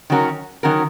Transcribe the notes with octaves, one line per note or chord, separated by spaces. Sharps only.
D#3 F#3 C#4 F#4 A#4
D#3 F#3 C#4 F#4 A#4